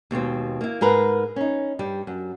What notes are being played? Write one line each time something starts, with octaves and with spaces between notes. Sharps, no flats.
D#2 B2 G#3 C4
A#3 E4
G#2 G#4 A#4 B4
C#4 D#4
G2 G3
F#2